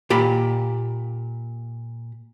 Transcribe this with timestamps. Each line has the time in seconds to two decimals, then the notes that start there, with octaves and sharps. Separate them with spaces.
0.10 A#2 G4 B5